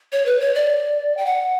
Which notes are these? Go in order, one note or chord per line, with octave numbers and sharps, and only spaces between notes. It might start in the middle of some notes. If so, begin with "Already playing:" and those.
C#5
B4
C#5
D5
G5
F#5